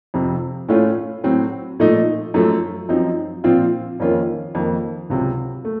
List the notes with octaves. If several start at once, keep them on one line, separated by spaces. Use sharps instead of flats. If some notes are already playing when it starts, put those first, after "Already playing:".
F2 C3 F3
A2 A3 C#4 F4
A2 F#3 C4
A#2 F3 A3 D#4
F#2 F3 A3
F#2 F3 C4 D#4
A#2 F3 C4 F4
F2 D#3 A#3 C#4 F4
F2 D#3 A#3
C#2 C3 F#3
A3